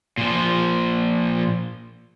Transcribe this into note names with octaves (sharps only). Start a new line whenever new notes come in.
A#2 F3